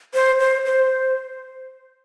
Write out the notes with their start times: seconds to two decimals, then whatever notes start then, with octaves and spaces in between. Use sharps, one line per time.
0.14 C5
0.40 C5
0.66 C5